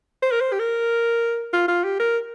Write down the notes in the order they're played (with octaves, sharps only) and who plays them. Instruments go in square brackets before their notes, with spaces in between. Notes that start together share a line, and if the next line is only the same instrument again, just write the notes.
[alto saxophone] C5
A#4
C5
G4
A#4
F4
F4
G4
A#4